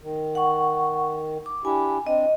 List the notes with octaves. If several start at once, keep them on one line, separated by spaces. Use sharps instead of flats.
D#3
F#5 C#6
D6
D4 E4 G4 G#5
C4 D4 D#5